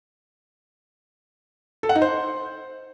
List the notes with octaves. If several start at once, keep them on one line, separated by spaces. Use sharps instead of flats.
A4
F#5
D#4
C5